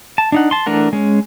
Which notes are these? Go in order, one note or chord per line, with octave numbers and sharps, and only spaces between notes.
A5
D4 D#4 F#5
A5 C6
E3 A3 D4 A#4 F#5
G#3 C#4